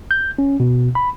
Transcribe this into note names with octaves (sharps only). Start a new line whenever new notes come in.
G6
C#4
B2
B5